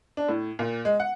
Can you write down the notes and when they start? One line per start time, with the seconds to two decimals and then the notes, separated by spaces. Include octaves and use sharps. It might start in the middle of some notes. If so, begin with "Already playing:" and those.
0.17 D4
0.28 A2
0.59 A#2
0.85 G#3
1.00 F#5